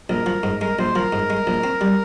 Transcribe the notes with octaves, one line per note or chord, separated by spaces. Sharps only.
A#1 A#4
F3
G#2
G#3 A#4
A#1 C5
F3 A#4
G#2
G#3
A#1
C4
G3